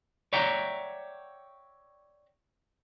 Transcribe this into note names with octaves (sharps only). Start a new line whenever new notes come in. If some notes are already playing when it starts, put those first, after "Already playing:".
C#5 D5 E5 F#5 G5 A#5